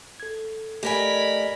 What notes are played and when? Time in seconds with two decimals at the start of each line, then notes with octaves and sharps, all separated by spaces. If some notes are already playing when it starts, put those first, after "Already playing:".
0.20 A4 G#6
0.83 A3 D#4 G4 A#4 D5 G#5 B5